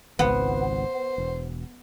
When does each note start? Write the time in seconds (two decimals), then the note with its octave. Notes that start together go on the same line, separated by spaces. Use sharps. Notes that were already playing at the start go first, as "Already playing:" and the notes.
0.19 G#1 C#2 B3 C5
1.18 E1